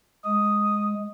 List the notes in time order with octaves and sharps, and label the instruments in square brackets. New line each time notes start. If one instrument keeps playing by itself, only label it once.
[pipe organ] G#3 [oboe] D#6